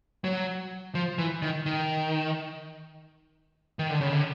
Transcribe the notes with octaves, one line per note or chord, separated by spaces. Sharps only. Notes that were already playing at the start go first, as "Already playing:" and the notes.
F#3
F3
E3
D#3
D#3
D#3
D3
C#3
D3